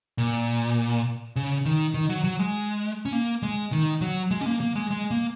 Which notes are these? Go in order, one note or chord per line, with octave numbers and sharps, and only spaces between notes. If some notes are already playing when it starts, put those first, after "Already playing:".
A#2
C#3
D#3
D#3
F#3
F#3
G#3
C#4
A#3
G#3
D#3
F#3
G#3
C#4
A#3
A#3
G#3
G#3
A#3